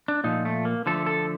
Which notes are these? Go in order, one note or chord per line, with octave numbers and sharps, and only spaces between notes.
D4
A#2 F3 A3 D#4
A3
A#3
D3 F3 A3 A4
A4